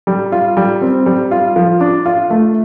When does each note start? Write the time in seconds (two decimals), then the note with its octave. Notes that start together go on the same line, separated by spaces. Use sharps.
0.07 G3
0.32 F4
0.57 G3
0.82 C4
1.06 G3
1.31 F4
1.56 F3
1.81 D4
2.06 F4
2.30 A3